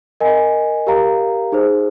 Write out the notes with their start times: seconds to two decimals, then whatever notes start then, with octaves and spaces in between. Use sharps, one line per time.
0.20 A#4 D#5 G#5
0.87 G4 A#4 F5 A#5
1.52 D#4 G#4 C5